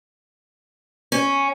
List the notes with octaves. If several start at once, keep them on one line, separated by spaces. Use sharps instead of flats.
C#4